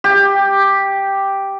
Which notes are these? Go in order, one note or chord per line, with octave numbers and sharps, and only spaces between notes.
G4